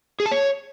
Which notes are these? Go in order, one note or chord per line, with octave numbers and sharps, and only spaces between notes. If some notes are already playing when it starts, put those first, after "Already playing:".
G#4
A5
C#5